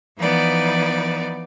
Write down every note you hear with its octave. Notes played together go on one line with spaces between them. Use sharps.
E3 F3 B3 D#4 B4 D5